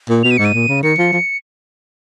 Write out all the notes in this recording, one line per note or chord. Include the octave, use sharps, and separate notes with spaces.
A#2
B2 F7
D#7
G#2 C#7
D#7
A#2
C#3
D#3 C#7
F3
F3